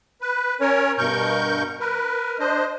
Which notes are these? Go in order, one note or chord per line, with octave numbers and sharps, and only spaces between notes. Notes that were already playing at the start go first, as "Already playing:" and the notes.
B4
C#4 A#4 C#5
G2 B2 A#4 C#6 G6
A#4 B4
D4 C5 D#5